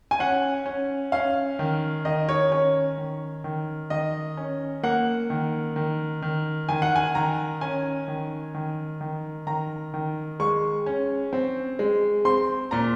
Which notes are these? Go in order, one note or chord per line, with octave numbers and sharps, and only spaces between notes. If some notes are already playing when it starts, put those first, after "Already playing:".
G#5
C#4 F#5
C#4
C#4 F5
D#3
D#3 D#5
C#5
C#4 C#5
D#3
D#3
D#3 D#5
C#4
A#3 F#5
D#3
D#3
D#3
D#3 G#5
F#5
G#5
D#3 A#5
C#4 G#5
D#3
D#3
D#3
D#3 A#5
D#3
G#3 C#6
C#4
C4
G#3
C4 C6
A#2 A#5